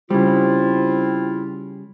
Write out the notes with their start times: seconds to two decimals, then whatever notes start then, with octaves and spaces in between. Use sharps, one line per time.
0.10 C#3 G3 C4 E4 F4